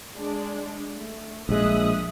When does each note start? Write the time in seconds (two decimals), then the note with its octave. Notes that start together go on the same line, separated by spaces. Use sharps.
0.18 G#3 D4
0.94 A3
1.49 A#1 G#3 E5 D#6 F#6